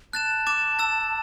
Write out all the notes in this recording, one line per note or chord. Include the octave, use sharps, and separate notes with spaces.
A5 F#6 A6 E7
D6 A6 E7
E6 A6 E7